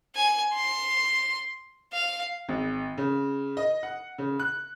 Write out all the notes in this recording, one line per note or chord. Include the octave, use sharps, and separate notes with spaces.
G#5
C6
F5
G#1
C#3
D#5
F#5
C#3
F#6